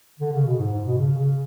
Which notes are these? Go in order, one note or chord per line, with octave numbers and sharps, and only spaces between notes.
D3
C#3
B2
G#2
G#2
B2
C#3
C#3